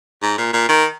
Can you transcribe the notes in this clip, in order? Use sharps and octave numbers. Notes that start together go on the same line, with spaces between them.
G#2
A#2
A#2
D#3